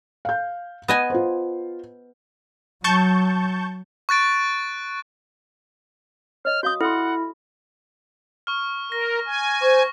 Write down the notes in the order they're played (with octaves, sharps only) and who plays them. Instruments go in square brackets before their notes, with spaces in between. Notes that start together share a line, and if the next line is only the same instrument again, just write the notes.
[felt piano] F5 G6
[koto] B3 D#5 G#5
[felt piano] F4 C5
[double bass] F#3 [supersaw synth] A5 C#6 G6
[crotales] C#6 F#6 A6 D7
[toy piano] C#5 D#5 [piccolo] F6
[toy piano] F#4 F5 D#6 [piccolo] G6
[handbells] E4 [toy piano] A4 C6 [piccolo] F#5
[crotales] C#6 F6
[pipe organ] A#4 [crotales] A#6
[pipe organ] G#5
[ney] C5 [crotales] C#6